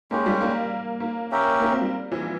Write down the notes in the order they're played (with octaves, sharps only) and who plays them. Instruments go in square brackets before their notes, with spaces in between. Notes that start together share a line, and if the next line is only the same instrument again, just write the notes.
[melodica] G#3 C#4 G4 [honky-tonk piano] A#3
[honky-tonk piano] G3
A#3
A#3
[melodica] C#4 G4 A#4 E5
[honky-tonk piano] A#3
C4
G3
E3
F3